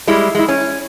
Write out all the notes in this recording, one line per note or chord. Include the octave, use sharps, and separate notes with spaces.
G3 G#3 E4
G#3 E4
C#4